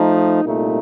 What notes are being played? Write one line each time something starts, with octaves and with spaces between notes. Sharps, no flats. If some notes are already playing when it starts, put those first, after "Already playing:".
Already playing: F3 A3 D#4
C2 A#2 A3 D#4